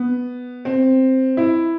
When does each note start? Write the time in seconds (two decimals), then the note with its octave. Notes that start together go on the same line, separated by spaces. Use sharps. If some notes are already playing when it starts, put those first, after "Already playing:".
Already playing: B3
0.65 C4
1.37 E4